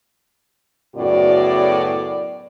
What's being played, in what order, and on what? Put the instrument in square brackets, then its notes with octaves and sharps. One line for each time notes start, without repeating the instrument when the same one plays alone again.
[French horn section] F#2 A2 C#3 B3 F#4 D5